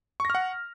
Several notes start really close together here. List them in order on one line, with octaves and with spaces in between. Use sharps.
C#6 A#6 F6 F#5